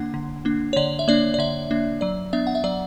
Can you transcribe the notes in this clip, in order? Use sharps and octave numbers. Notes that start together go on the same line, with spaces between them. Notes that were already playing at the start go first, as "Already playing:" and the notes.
Already playing: D3 A#3 D4 F#5
D3
A#3 D4
C#5
D3 D5
E5
A#3 D4 D5
D5
D3 E5
A#3 D4
F#3 D5
B3 D4 E5
F#5
E5
F#3 D5